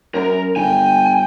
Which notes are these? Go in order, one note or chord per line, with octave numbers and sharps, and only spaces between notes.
F#2 A#4
G1 G5 G#5